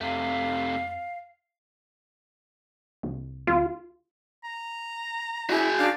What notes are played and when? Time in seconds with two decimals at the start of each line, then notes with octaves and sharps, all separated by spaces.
0.01 F2 C3 A3 F5
3.03 C2
3.47 D2 F4
4.44 A#5
5.50 E4 F#4 G#4
5.78 D4 F5